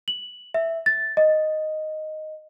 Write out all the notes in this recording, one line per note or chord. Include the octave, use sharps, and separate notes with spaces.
F#7
E5
A6
D#5